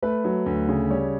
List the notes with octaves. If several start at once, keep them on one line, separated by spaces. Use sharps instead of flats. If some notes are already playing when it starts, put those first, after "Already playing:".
A3 B4
F#3
D2
C#3
G3 C#5